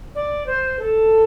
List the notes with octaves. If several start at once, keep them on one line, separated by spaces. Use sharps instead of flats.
D5
C5
A4